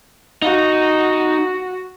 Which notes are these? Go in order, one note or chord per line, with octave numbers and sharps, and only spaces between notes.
D#4 F#4